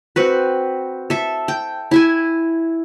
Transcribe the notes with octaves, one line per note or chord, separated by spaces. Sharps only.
C4 F#4 B4
A4 E5
G5
E4 E5 G#5